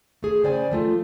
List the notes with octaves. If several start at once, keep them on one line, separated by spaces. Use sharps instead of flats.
A3 G#4
C#3 C5 D5 G5 G#5
F3 A3 F4